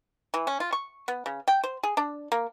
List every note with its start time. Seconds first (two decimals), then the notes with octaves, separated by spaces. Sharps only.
0.34 E3
0.47 C#4
0.60 F4
0.73 C#6
1.08 B3
1.26 C#3
1.48 G5
1.64 C5
1.83 G#4
1.97 D4
2.32 A#3